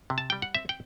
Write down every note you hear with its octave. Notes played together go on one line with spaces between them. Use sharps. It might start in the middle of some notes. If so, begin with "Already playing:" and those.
C3
A5
G3 G5
F#5
C4 E5
G5